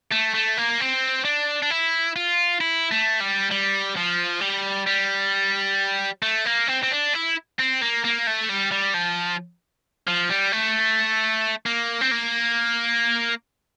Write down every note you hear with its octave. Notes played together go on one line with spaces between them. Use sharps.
A3
A3
A#3
C4
D4
D4
E4
F4
E4
A3
G3
G3
F3
G3
G3
A3
A#3
C4
C4
D4
E4
C4
A#3
A#3
A3
G3
G3
F3
F3
G3
A3
A#3
C4
A#3